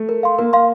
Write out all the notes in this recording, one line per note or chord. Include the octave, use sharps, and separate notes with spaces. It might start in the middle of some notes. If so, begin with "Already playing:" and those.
Already playing: A3
A#4
F5 C6
A#3 A#4
F5 C6